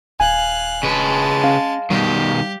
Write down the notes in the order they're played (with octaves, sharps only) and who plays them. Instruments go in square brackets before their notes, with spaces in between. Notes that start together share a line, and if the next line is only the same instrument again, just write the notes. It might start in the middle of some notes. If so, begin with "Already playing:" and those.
[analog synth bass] D#1 [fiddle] F5 F#6 [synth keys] G#5
[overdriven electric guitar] C#3 B4 [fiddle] G#3 A5
[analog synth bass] C#4 [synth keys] F5
[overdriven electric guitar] B2 D#3 [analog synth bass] G3 [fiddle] G4